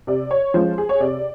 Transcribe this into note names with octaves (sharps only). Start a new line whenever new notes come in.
C3 D5
C#5
F3 G#3 C#4 C5
G#4
C#5
C3 D5